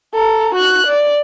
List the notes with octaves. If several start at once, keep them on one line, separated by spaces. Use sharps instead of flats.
A4 A#5
F#4 F#6
D5